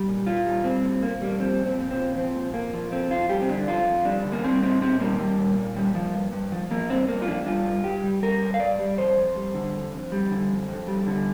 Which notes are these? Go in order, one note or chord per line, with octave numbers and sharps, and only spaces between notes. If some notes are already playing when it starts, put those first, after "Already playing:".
Already playing: G3
A#2
A#2 F4
G3
G3 C4
A#2
A#2 A#3
G3 A#3
F3 C4
A#2
C4
A#2
C4
F3
F3 C4
A#2
A#2 A#3
F3
F2 C4
F2 F4
G3 G4
C4
D3 D4
F2 F4
F2
G3 D4
D3
A#3
G3 C4
A#2 C4
A#2 C4
G3 A#3
G3
A#2
A#2
G3
F3
G2
G2
F3
F3 A#3
G2 C4
G2 A#3
F4
F3 D4
G3 F4
G2
G2 G4
G3
G3 A#4
G2
F5
G2 D5
G3
F2 C5
F2
G3
D3
F2
F2
G3
D3
F2
F2
G3
D3